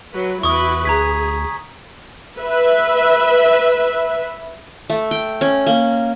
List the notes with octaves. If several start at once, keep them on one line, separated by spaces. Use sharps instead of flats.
F#3 B4
E2 E4 F#4 B4 C#6 D#6
D2 G#4 A#5 G#6 B6
B4 E5
A3
G5
C#4
A#3